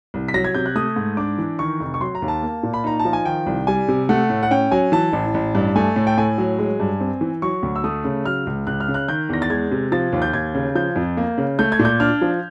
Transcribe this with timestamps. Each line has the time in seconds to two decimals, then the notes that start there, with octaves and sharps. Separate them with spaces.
0.14 C2
0.28 B6
0.34 F#3 A#6
0.44 G#6
0.54 C3 G6
0.66 F#6
0.75 A3 D#6
0.96 G#2
1.17 D4 D6
1.38 E3
1.59 D#3 C#6
1.80 F1
1.94 C#6
2.01 F#3 C6
2.15 A#5
2.22 D#2
2.28 A5
2.43 A#3
2.63 A#2
2.74 B5
2.84 D#4 A#5
3.00 A5
3.05 F3
3.13 G#5
3.25 D#3 G5
3.46 C2
3.67 G3 G#5
3.88 C3
4.09 A3 F#5
4.30 A2
4.43 F#5
4.51 C#4 G5
4.71 F#3 G#5
4.92 E3 A5
5.13 A1
5.34 A1
5.55 G2
5.76 A3 G#5
5.96 A2
6.07 G5
6.17 A2 G#5
6.38 F#3
6.59 G#3
6.80 G2
7.00 C4
7.21 E3
7.42 F#3 C#6
7.63 D2
7.76 E6
7.84 A3 D#6
8.04 C#3
8.25 F#3 F6
8.47 C#2
8.67 C#2 F#6
8.80 F6
8.88 C#3
8.94 F#6
9.08 D#3 G6
9.29 E2 A#6
9.42 A6
9.50 G#3 G#6
9.71 C3
9.92 F3 A6
10.12 D#2
10.22 G6
10.34 D#2 G#6
10.55 C#3
10.75 F3 G6
10.96 F2
11.17 A#3
11.38 C#3
11.59 A3 G6
11.72 G#6
11.79 A#2
11.85 G6
12.00 D4 F6
12.22 F3